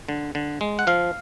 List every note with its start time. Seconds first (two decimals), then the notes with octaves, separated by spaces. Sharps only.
0.09 D3
0.35 D3
0.61 G#3
0.79 F#5
0.87 F3 F5